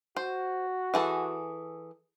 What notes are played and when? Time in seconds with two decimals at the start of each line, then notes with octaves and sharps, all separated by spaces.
0.16 F#4 C5
0.94 E3 G#4 A4